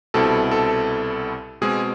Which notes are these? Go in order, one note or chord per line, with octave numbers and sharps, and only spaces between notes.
C2 B2 G3 C4 E4 A4
A4
B2 G#3 C4 G#4